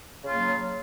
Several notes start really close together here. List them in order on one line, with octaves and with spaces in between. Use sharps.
C#3 F4 A#3 F#3